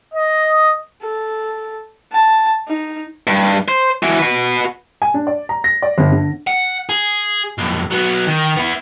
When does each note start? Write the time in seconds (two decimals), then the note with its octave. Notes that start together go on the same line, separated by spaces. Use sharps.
0.14 D#5
1.02 A4
2.13 A5
2.68 D#4
3.27 G2
3.68 C5
4.03 E3 F#4
4.19 F#4 B4
5.02 G#5
5.14 D4
5.27 D5
5.49 A#5
5.64 A#6
5.82 D5
5.98 G1
6.12 D3
6.47 F#5
6.89 G#4
7.58 B1 F2
7.91 F#3 B3
8.27 D#3
8.56 B3 E4